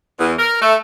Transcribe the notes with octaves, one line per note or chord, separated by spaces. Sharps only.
E2
A#4
A3